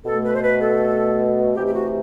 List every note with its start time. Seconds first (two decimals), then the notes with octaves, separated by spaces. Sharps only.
0.06 B2 A3 A4
0.24 B4
0.35 C5
0.43 B4
0.62 A4
1.56 C3 E3 A3 G4
1.67 G4
1.75 F#4